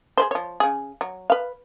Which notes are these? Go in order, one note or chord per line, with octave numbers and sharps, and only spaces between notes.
G#4 B4 C5
F3 C#5
C#3 G#4
F#3
B4 F5